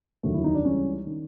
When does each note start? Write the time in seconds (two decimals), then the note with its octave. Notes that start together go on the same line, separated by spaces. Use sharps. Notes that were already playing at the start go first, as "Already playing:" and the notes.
0.23 F1 D#2 D3 F#3 A3
0.34 E4
0.44 D#4
0.55 D4
0.64 C#2 C#3 E3 G3 C#4
1.07 D#3